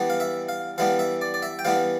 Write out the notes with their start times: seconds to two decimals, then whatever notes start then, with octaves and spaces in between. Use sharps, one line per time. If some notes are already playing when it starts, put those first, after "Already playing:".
Already playing: E3 G3 B3 D4
0.10 F5
0.20 E5
0.49 F5
0.78 E3 G3 B3 D4 F5
0.99 E5
1.21 D5
1.34 D5
1.42 E5
1.59 G5
1.65 E3 G3 B3 D4 F5